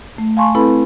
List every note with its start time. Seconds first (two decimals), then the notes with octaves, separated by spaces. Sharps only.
0.18 A3
0.37 F5 G#5 A5 C6 C#6
0.55 C4 E4 A4 B4 B5